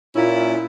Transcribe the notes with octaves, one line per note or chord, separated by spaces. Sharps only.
A#2 A#3 C#4 E4